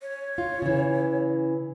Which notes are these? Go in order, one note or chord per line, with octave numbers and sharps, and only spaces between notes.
C#5
F4
C#3 E3